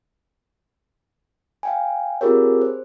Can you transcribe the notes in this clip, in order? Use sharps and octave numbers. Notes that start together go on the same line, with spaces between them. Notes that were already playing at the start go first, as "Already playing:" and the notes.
F5 G5 G#5
C4 F4 G4 G#4 A#4 C#5
C5